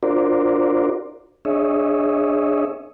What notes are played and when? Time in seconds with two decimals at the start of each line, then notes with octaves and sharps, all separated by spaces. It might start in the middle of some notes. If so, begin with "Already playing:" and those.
0.03 D4 F4 F#4 A#4 C5 D5
1.45 D4 G#4 C#5 D#5 E5